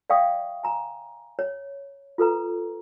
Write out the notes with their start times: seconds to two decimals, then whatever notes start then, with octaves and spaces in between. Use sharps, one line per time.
0.10 D5 E5 F5 G5 C#6 D#6
0.64 G#5 A#5
1.39 C#5
2.18 F4 A4 B4 A#5